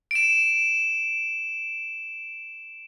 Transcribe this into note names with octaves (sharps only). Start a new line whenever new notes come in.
D7 E7